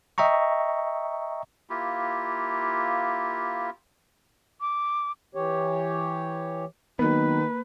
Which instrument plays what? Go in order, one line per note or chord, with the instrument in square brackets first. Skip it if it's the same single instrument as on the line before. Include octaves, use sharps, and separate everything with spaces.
[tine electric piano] D#5 E5 G5 A#5 C#6
[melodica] A#3 E4 F4 G4
[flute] D6
[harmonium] E3 G4 C#5
[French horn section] D#3 [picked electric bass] F#3 B3 [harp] A#3 [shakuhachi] B4